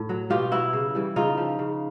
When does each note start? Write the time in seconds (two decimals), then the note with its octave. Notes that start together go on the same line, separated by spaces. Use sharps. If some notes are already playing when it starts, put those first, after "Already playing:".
Already playing: A2
0.09 F#3
0.30 B2 F4 G4
0.51 F#3 E4 F#4
0.73 C#3
0.95 E3 G3
1.16 C#3 D#4 F4
1.38 F3
1.59 C#3